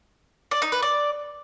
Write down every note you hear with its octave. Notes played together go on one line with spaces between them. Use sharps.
D5
D#4
B4
D5